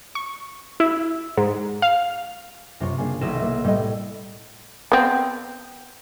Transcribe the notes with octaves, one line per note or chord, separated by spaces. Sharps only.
C#6
E4
G#2
F5
F#2 C3 F4 C#5
C#3 A#3 D4
B1 D#3 F#3 E4 D#5 E6
A#3
A2 G3 C#5 D#5
B3 C4